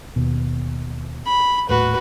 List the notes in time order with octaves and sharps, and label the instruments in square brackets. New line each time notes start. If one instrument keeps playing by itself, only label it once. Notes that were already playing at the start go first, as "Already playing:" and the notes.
[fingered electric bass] D#2 B2
[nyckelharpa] B5
[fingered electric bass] D#1 A2 [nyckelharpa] F#4 B4